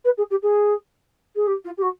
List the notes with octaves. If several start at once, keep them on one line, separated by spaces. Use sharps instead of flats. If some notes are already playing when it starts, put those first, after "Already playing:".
B4
G#4
G4
G#4
G#4
G4
F4
G4
F#4